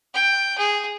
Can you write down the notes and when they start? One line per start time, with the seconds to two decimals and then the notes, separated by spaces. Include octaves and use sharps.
0.14 G5
0.58 G#4